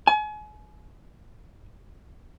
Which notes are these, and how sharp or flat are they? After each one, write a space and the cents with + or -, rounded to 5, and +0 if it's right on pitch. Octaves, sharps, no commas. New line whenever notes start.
G#5 +35